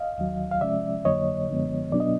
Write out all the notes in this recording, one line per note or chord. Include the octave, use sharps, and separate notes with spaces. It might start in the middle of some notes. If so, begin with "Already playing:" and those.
Already playing: D#5 F5
D#2 D#3 F#3
F5
C3 F3 G#3 C#4 D5 E5
F2 D3 F#3 A#3 C#5 D#5
F#2 D3 F3 G#3 B3
B2 F#3 B3 D4 D5
D#5